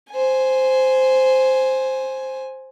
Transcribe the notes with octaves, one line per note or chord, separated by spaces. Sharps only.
C5 G#5